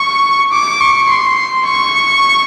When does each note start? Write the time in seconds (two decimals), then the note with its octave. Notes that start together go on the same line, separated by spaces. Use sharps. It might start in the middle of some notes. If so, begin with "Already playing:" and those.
Already playing: C#6
0.52 D6
0.81 C#6
1.09 C6
1.65 C#6